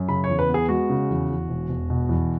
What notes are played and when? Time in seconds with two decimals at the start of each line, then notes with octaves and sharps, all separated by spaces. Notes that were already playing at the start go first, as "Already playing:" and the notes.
Already playing: F#2
0.08 C#3 B5
0.24 C#5
0.29 E2
0.39 B4
0.49 B3
0.54 G#4
0.69 G#3 F#4
0.90 C#3
1.09 E2
1.29 E2
1.49 E1
1.69 E1
1.90 B2
2.09 E2